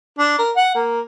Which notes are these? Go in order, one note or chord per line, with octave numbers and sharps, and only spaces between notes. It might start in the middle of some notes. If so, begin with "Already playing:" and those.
D4
A#4
F#5
A#3